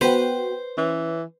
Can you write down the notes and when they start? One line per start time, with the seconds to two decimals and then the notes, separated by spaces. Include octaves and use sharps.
0.01 B3 F#4 B4 C5 G5
0.78 E3 C#4